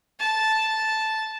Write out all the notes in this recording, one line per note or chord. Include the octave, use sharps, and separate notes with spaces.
A5